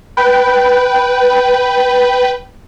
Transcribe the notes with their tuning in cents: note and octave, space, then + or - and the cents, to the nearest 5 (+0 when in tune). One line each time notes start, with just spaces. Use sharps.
B4 +0 G5 -15